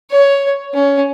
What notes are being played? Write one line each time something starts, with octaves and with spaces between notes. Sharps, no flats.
C#5
C#4